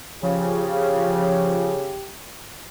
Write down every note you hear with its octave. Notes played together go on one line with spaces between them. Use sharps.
C#3 F3 G4